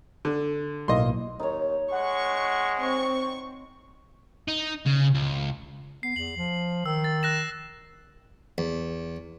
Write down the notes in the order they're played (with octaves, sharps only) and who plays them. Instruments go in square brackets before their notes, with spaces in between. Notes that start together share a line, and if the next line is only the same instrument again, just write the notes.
[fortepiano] D3
[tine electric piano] B1 A2 A#3 [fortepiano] D#5 C6
[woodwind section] D#2 [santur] D#4 C#5
[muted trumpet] G#3 [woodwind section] F#5 [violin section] C#6
[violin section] C4 C#6
[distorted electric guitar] D#4
C#3
C#2
[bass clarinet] B3 [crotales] C7
[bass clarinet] E2 [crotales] F#7
[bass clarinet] F3
[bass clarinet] D#3 [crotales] E6
[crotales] A6
F#6 A#6 E7
[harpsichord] E2